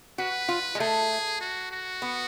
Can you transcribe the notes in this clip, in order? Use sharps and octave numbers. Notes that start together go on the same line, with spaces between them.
F#4 B4
F4
G#3
A3 G#4
F#4
F#4
B3